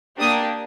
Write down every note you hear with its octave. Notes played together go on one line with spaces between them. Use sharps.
A#3 D4 G4 D#6